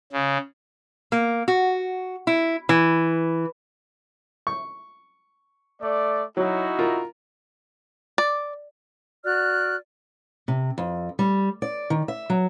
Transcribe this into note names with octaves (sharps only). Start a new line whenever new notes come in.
C#3
A#3
F#4
E4
E3
C#6
A3 D5
F#3 D#4 E4 F#4
F4 A#4
D5
F#4 D5 F6 F#6
C3
F2
G3
D5
D#3
E5
F#3